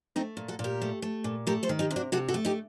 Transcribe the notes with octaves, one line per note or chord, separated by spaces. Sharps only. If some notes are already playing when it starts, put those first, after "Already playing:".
A3 C4 D#4
A#2
F#4 A4
A#2
G4 A#4
A3
A3
A#2
A3 G4 A#4
A4 C5
D#3
D#4 G4
C3
D4 F#4
C3 F#4 A4
F#4 A4
A3
D#4 G4